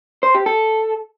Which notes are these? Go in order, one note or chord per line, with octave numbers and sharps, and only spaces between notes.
C5
G4
A4